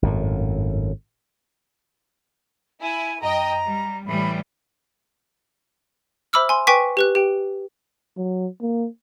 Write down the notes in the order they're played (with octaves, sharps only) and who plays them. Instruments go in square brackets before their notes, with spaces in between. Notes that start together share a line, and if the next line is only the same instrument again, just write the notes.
[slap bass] G#1 F#2 A2
[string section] E4 [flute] G#5
[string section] F#2 D#5 G5 [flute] A#5
[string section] G3
[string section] A2 E3 G3 [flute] B5
[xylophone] C5 E5 B5 D6 E6 F6
G#5 C6
B4 G5 G#5 C#6 D6 B6
G4 B4 F#6
G4 G5
[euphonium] F#3
A#3